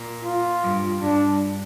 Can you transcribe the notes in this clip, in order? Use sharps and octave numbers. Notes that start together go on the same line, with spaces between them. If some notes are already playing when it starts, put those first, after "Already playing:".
Already playing: A#2
F4
G2
G2 D4